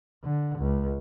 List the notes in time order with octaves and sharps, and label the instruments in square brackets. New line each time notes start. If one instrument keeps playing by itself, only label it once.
[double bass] D3
C#2